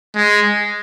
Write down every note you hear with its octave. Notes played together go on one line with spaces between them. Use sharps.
G#3